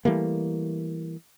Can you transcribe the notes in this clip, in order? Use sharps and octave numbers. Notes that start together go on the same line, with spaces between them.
E3 G3 A3 A#3